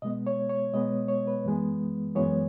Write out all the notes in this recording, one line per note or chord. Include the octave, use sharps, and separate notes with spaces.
B2 G#3 B3 D#5
C#5
C#5
B2 G#3 B3 D#5
C#5
B4
F#2 E3 G#3 B3
F#2 E3 G#3 B3 C#5